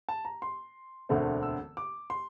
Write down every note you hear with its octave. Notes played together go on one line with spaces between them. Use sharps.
A5
A#5
C6
E1 D2 D3 A3 C4
E6
D6
C6